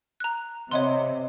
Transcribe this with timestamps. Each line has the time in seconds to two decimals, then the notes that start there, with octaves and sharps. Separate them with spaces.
0.20 A#5 F#6
0.71 C3 E4 C#5 D#5 F#5 C6